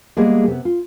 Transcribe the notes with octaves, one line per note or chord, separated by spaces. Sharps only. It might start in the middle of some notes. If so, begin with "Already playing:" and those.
G3 G#3 A#3 B3 G#4
C3 B3
F4